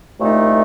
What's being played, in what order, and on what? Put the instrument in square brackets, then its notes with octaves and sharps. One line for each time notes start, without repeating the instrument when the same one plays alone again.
[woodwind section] C2 A#2 A3 D#4